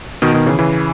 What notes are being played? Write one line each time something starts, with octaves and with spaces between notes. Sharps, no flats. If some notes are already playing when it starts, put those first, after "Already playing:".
B2 D#3
B2 D#3
C#3 E3
C#3 E3